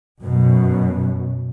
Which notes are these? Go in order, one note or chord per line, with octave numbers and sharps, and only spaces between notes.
F#2 B2